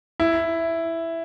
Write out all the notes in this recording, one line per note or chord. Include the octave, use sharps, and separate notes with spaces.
E4